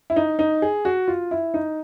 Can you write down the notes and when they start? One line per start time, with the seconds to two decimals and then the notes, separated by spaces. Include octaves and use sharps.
0.10 E4
0.16 D#4
0.39 D#4
0.62 G#4
0.85 F#4
1.08 F4
1.31 E4
1.54 D#4